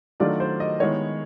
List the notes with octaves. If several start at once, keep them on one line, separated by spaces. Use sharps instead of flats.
D#3 F#3 A3 D4 F4 D5
C5
D#5
D#3 G#3 B3 E4 C#5